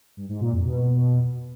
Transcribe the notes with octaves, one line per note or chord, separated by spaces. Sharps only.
G2
G#2
A#2
F2
B2